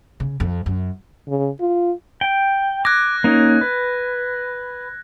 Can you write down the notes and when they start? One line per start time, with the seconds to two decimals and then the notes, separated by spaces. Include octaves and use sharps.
0.20 C#3
0.40 F2
0.66 F#2
1.28 C#3
1.60 F4
2.21 G5
2.85 D6 F#6 G#6 A#6
3.24 A#3 C#4 D#4
3.61 B4